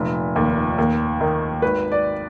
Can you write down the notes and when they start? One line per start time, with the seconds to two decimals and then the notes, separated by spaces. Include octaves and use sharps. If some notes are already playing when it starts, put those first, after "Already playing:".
Already playing: F1 A#2
0.36 D#2
0.78 D#2
1.21 D#3
1.62 G#1 B4
1.92 D5